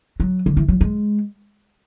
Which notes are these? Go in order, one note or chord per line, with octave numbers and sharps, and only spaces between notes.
F#3
D3
E3
F#3
G#3